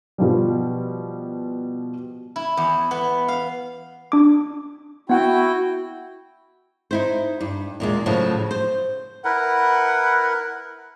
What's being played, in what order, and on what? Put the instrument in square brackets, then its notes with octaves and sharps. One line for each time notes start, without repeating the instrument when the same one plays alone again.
[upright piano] B2 F3 G3
[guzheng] E4
E2
B3
F5
[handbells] D4 D6
[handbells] B3 F#5 [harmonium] E4 F#4 G5
[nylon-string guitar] D#4 E4 C5
G2
E2 A#2 G#3
A2 C#3 F3 F#3
C5
[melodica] E4 A#4 B4 [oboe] F#5